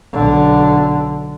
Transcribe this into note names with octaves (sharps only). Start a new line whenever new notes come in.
B1 D3